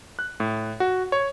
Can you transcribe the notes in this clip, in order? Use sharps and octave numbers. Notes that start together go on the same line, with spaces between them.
F#6
A2
F#4
C#5